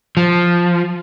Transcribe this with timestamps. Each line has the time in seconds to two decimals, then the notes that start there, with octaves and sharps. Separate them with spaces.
0.17 F3